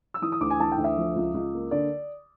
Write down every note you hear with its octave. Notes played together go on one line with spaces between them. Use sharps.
E6
E3 D#6
D#6
D2 D6
G#5
E3 A5
G5
D2
E5
F3
C#2
C#2
A#3
D3 D5